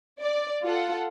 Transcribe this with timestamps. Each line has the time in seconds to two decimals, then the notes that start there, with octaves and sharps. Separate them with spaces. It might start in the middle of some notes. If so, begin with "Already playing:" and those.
0.20 D5
0.63 F4 A4 F#5